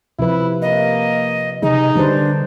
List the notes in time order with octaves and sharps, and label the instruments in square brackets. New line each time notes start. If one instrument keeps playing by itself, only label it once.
[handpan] C3 F3 B4 [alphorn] E4
[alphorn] A#3 [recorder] D#5
[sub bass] C3 [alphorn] D#4 [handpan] G#4 [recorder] D#5
[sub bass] D3 [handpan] G3 B4 C5 [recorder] D4